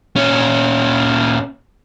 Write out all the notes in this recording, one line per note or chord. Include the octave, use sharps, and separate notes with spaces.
A#2 C#4